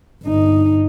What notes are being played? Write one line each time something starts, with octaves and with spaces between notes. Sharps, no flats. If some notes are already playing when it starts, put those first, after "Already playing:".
G1 D#4